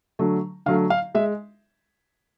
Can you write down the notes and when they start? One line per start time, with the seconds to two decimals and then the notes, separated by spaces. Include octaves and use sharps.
0.19 D3 F#3 A3
0.66 D3 F#3 A3 F5
0.90 F5
1.15 G#3 E5